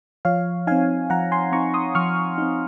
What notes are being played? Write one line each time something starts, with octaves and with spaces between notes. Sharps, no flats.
F3 C#5 F5
C4 D#4 F5 G#5
F3 F#5 A#5
G#5 C6
C4 D#4 A#5 C#6
C6 D#6
F3 C#6 F6
C4 D#4